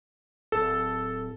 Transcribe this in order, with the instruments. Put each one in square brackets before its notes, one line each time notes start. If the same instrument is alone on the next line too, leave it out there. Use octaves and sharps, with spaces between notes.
[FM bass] D1 [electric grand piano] A4